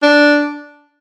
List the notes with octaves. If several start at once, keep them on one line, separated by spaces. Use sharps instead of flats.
D4